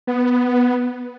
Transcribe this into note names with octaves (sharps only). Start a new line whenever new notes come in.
B3